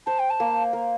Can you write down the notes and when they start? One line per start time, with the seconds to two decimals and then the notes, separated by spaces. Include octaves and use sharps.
0.06 C5 A5
0.19 G5
0.30 A5
0.40 A#3
0.73 A#3